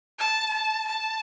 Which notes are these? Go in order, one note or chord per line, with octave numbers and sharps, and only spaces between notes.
A5
A5
A5